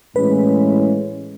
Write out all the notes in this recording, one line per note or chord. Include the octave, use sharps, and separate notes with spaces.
A2 E3 G#3 C#4 B4